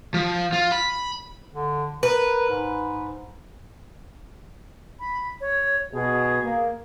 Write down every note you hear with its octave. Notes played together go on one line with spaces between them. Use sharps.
F3
F4
B5
D3
A#4 B4
G#2
B5
C#5
B2 G#4
A#3